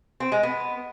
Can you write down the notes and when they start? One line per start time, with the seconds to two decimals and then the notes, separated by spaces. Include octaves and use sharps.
0.20 C4
0.32 G#3
0.43 B3